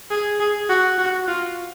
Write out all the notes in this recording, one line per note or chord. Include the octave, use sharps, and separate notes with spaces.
G#4
G#4
F#4
F#4
F4